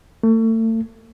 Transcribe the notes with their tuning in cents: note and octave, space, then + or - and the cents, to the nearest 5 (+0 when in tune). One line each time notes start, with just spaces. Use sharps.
A3 +35